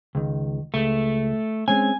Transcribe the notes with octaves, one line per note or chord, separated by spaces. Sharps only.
C#2 D#3
C#2 A3
G#3 C4 C#4 G#5